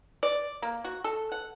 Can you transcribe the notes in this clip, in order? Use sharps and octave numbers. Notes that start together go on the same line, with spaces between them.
D5
A#3
F#4
A4
F#5